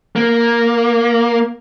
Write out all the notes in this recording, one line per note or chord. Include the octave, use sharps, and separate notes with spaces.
A#3